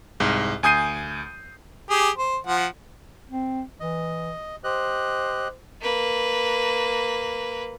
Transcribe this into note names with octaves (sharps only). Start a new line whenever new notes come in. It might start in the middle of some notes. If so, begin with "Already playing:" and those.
C2 G#2
D2 G#5 D#6 G6 C7 D#7
G4 G#4
C5
F3 F#5
C4
E3 D#5
G4 C5 D#5 F#6
A#3 B4